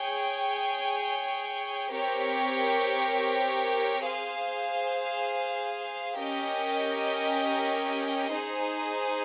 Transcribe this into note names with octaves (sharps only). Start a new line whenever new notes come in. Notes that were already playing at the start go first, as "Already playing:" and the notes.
Already playing: G#4 C#5 G5
C4 G4 A#4 C#5
G#4 C5 F5
C#4 G4 A#4 D#5
D#4 G#4 C5